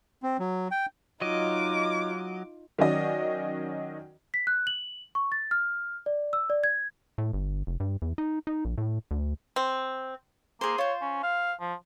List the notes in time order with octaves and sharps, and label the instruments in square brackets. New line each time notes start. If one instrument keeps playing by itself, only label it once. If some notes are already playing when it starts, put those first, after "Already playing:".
[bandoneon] C4
F#3
G5
[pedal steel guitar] F#3 D#5 [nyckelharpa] D#4 F4 [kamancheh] D6
[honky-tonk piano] D#3 F#3 C#4 F#4 D5 D#5
[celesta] B6
F#6
F#7
C#6
A6
F6
D5
E6
D5
G#6
[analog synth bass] A2
G1
F1
G2
E2
D#4
D#4
A#1
A2
D2
[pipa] C4
[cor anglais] A#3 [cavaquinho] G#4 C5
[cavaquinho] F4 C5 [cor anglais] C#5
[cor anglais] C#4
F5
F3